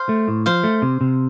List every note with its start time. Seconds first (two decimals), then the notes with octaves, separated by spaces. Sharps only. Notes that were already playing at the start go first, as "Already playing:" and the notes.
Already playing: C5 F5
0.09 A3
0.28 A2
0.46 F3 C5 F5
0.64 A3
0.82 C3
1.01 C3